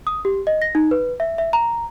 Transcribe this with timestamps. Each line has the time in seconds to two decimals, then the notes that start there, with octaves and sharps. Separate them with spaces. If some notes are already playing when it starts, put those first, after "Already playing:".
0.07 D#6
0.25 G4
0.47 D#5
0.62 A#6
0.75 D#4
0.91 B4
1.20 E5
1.38 E5
1.53 A#5